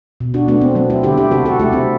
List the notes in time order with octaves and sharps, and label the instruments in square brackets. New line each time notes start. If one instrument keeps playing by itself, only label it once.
[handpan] B2
D4 F#4
A3 B3 D4
C4
F#3 C4
C4 E4
D3 E4 G4
E4 G4
C3 F#4 A4
F#4 A4
A3 E4 G4
C4 E4